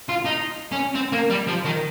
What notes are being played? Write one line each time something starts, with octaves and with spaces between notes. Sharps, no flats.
F4
D#4
C#4
C4
A#3
G3
F3
D#3